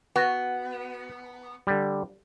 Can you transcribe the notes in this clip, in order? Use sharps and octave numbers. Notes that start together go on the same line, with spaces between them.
B3 F#4
D3 G3